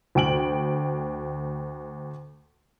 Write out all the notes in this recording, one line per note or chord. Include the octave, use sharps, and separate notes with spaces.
D2 G5 D7 F#7